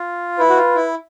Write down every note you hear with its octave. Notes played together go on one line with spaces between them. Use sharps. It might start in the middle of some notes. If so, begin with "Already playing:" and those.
Already playing: F4
E4 B4
F#4
F4
E4